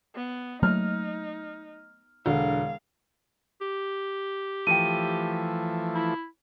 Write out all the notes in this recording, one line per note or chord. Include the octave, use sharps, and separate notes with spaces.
B3
F#3 A3 A#3 D#4 F6
E1 D3 F5
G4
E3 F3 A3 G5 D#7
E4